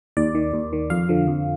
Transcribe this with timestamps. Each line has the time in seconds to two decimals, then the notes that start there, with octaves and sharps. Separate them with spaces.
0.17 D#2 D5
0.35 D#3
0.54 D#2
0.73 D#3
0.90 F2 F5
1.09 D3 F3
1.28 F2